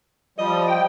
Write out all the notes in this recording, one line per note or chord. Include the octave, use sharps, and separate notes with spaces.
F3 G3 D#5
G5